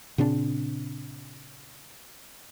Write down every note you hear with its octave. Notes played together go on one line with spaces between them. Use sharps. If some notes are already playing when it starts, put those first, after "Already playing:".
A#2 C#3 C4 D4